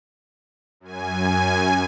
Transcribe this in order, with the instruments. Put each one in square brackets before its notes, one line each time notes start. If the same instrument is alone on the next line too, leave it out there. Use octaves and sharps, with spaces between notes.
[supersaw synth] F#2 G#5